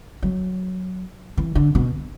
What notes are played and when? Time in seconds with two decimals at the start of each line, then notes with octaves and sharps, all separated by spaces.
0.22 F#3
1.37 E3
1.55 D3
1.75 B2